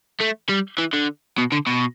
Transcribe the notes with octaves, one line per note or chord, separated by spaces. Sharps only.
A3
G3
E3
D3
B2
D3
B2